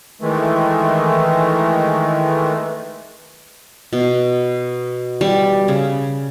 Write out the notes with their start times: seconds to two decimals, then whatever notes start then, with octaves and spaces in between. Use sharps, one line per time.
0.21 D#3 E3 G#3 A3
3.93 B2
5.21 G3
5.68 C#3